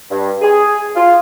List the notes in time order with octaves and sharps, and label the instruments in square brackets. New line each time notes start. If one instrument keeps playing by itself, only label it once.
[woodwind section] G2
G#4
F4